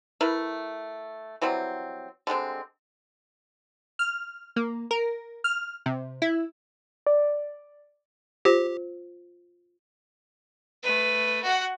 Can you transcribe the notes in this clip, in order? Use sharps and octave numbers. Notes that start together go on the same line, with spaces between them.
A3 E4 A#4 B4
E3 F#3 G3 C4
D3 G3 G#3 C4
F6
A#3
A#4
F6
C3
E4
D5
F4 G4 C5
A3 B4
F#4 F#5